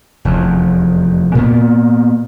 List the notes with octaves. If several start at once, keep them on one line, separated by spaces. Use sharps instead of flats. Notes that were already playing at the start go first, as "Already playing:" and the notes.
F1 E2
A#2 A#3 B3